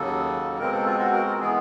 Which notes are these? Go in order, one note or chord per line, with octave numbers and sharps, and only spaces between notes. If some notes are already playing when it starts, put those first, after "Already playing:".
Already playing: D#2 C#3 F#3 A#3 A4
B2 G#3 C4 A#4
A4
F4
F#4
A#4
A#4
E3 G#3 B3 G#4